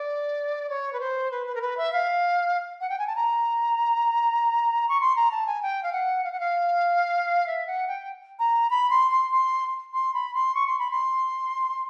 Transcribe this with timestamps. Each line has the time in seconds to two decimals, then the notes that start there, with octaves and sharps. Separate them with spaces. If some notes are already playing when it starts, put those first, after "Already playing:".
Already playing: D5
0.69 C#5
0.93 B4
1.00 C5
1.31 B4
1.46 B4
1.55 A#4
1.61 B4
1.77 E5
1.93 F5
2.81 F#5
2.89 G5
2.98 G#5
3.07 A5
3.16 A#5
4.88 C#6
5.01 C6
5.16 A#5
5.31 A5
5.47 G#5
5.62 G5
5.83 F5
5.93 F#5
6.24 F5
6.32 F#5
6.40 F5
7.47 E5
7.67 F#5
7.88 G5
8.39 A#5
8.70 B5
8.90 C6
9.11 C6
9.32 C6
9.93 C6
10.14 B5
10.34 C6
10.55 C#6
10.67 C6
10.79 B5
10.91 C6